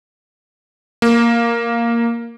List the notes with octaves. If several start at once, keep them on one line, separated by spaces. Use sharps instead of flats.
A#3